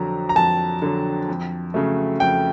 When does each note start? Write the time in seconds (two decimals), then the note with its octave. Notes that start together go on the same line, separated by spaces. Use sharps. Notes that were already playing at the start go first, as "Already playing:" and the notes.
Already playing: F2 D3 F#3 A#5
0.29 A#5
0.36 F2 A5
0.82 D3 F#3
1.29 F2
1.74 C#3 F#3 A3
2.20 F2 G5